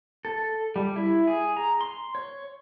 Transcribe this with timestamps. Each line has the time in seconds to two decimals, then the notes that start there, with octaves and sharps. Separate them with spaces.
0.25 A4
0.76 G3
0.96 E4
1.27 G#4
1.57 A#5
1.81 C6
2.15 C#5